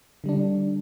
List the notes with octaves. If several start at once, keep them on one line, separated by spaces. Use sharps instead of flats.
D3 G3 D4